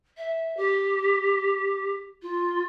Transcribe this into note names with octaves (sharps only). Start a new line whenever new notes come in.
E5
G4
F4